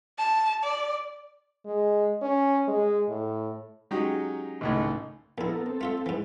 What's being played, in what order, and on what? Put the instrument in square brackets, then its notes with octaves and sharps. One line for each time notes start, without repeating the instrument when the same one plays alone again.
[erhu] A5
D5
[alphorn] G#3
C#4
G#3
A2
[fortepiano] F#3 G#3 C#4 D#4 G4
G#1 C#2 A2
[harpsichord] A#1 E4 [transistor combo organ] B3 A4 A#4
[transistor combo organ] C4 A4
[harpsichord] A3 F4 E5
G#2 E3